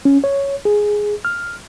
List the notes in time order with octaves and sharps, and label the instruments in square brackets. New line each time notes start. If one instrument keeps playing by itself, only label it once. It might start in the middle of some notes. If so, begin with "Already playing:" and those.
[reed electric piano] C#4
C#5
G#4
F6